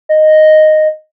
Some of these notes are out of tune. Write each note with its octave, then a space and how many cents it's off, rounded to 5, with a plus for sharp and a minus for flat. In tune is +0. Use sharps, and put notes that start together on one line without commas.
D#5 -5